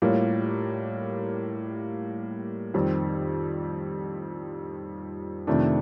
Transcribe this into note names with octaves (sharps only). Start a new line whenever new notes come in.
A2 G3 A#3 F4
F2 D#3 G3 C4
F2 C3 D#3 A3 D4